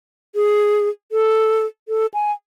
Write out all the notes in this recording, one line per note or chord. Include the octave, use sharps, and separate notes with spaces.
G#4
A4
A4
G#5